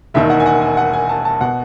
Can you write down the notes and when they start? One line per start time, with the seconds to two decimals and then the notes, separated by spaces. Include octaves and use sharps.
0.14 E1 D#2 D#3 E5
0.30 F#5
0.40 G#5
0.46 F#5
0.61 G#5
0.77 F#5
0.93 G#5
1.09 A5
1.25 A5
1.41 B2 F#5